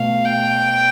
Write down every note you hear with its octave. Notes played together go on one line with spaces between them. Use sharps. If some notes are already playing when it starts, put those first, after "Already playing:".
Already playing: B2 A3 F5
G5